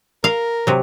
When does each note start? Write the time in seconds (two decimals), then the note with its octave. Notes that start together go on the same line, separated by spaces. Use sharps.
0.24 A#4 F5
0.67 C3 F#3